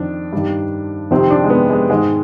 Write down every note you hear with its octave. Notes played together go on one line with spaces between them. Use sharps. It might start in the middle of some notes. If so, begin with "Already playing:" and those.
Already playing: F2 D#3 D4
G2 D#3
F2 C3 D#3 C4
D4
G#3
B3
G#3
G#2 D#3 G#3